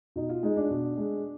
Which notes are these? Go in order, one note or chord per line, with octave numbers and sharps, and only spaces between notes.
B2 D#4
F4
G#3 D#4
D4
B2
G#3